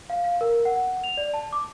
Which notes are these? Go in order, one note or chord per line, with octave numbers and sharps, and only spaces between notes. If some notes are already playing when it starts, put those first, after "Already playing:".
F5
F5
A#4
F#5
F7
D5
A5
D6